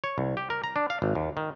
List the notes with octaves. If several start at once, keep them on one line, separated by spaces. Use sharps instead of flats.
C#5
C2
G4
A#4
A#5
D4
F5
G#1
D#2
D#3